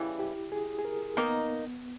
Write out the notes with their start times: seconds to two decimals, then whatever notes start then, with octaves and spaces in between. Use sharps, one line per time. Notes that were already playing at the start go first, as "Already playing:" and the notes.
Already playing: C#3 E3 G3 E4
0.19 G4
0.52 G#4
0.79 G#4
0.85 A#4
1.17 D#3 A#3 B3 D#4